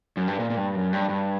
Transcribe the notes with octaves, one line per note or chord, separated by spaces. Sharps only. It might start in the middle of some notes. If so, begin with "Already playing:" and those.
F#2
G2
A#2
A#2
G2
F#2
G2
G2